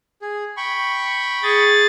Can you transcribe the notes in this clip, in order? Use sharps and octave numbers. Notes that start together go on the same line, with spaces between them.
G#4
G5 B5 C#6
G#4 A6